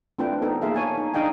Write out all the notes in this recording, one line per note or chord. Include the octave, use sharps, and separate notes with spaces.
A3 C4 D4 F4 B4 G5
B3 D#4 A4
A#3 G#4 E5 F5
C#5 G#5 A5
D#4
D4 D#4 D#5 F5 G5 G#5